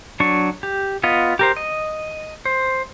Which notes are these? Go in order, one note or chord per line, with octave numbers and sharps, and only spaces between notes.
F#3 D4 C#6
G4
B3 F4 D#5
G4 A#4 C5
D#5
C5